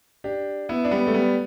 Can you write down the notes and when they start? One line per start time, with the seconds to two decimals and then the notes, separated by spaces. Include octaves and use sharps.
0.24 D4 G4
0.69 B3 E4
0.85 D4
0.91 G3 B3
1.07 A3
1.14 G3 B3